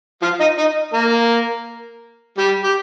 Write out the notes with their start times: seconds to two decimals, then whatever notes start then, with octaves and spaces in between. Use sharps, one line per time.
0.22 F3 F4
0.40 D#4 D#5
0.58 D#4 D#5
0.93 A#3 A#4
2.38 G3 G4
2.64 G4